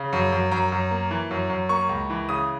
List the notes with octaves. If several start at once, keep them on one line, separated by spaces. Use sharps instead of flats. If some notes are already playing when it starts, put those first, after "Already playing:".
Already playing: C#3
F#2
F#2
F#2 A#5
F#2
A#3
E3
F#2
F#2
A#3 C#6
C#2
E3
C#3 D#6